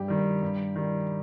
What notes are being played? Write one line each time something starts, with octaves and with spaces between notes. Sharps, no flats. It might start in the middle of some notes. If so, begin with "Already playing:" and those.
Already playing: G2 G4
D#3 G3
G2
D#3 G3